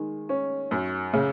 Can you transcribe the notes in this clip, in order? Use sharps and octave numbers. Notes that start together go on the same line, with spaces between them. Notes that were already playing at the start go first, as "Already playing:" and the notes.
Already playing: D#3 G#3
C#4
F#2
C#3